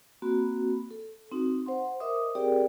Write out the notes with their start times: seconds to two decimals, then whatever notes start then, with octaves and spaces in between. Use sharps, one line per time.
0.22 A#3 C4 F#4 B5
0.91 A4
1.31 C4 D#4 F#4
1.66 C5 F#5 C6
2.00 A#4 C5 D#5 E5 D6 D#6
2.35 C4 G4 G#4 A#4 D5 G5